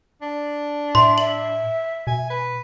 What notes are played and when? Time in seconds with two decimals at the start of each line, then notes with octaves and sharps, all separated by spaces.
0.22 D4
0.95 A2 E5 C6
1.18 E5 F#7
2.07 B2 G#5
2.30 B4